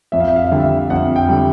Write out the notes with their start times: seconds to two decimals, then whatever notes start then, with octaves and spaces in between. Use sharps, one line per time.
0.12 F2 E5
0.20 F5
0.28 E5
0.36 F5
0.45 E5
0.52 D3 G3 F5
0.60 E5
0.90 F2 F#5
1.16 G5
1.28 D3 G3